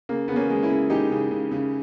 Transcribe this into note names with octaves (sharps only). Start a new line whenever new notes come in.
C#3 A#3
C#3 B3
A#3 C#4
G#3
C#4 E4
C#3
G#3 D#4 G4
C#3
C#3
C#3